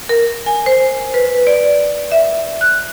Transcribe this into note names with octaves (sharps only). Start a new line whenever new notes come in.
A#4
G#5
C5
B4
D5
E5
F#6